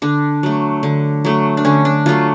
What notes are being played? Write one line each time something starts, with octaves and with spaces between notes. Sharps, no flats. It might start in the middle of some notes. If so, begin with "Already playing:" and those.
D3 D4
F#3 A3
D3
F#3 A3
D4
D3 C#4
D4
F#3 A3 F4